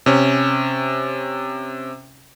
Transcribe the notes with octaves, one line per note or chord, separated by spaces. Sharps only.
C3 C#4